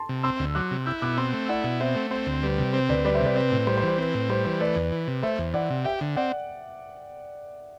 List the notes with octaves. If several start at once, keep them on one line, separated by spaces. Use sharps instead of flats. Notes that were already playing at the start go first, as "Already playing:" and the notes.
Already playing: A5 C6
C3
C4 C6 E6
D2
F#3 D6 F#6
C3
E4 E6 G6
B2 D6 F#6
C4 C6 E6
A3
E4 D5 F#5
B2
C4 C5 E5
A3
C4 C5
D2
G3 B4
C3
C4 C5
D2 B4 D5
G3 B4 D5
C5 E5
C3 B4 D5
C4 B4 D5
A2
G3 C5
C5
E3
C5
C4 B4
A2
G3 C5
E3 C5
A3 B4 D5
E2
E3
C3
A3 C5 E5
E2
E3 D5 F#5
C3
G4 E5 G5
D3
C4 D5 F#5